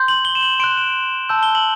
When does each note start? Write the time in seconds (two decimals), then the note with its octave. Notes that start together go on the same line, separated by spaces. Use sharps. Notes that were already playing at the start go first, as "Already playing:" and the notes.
Already playing: C6 G6
0.08 F#7
0.25 G7
0.35 E7
0.43 F#7
0.60 C6 F#6 D7
0.77 E7
1.29 A5 E6 G6
1.43 G7
1.55 F#7